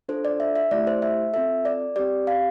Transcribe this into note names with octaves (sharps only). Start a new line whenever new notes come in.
D4 F4 A4 C5
D5
E5
E5
A3 E4 G4 D5
C5
E5
C4 F4 A4 E5
D5
C4 G4 D5
F5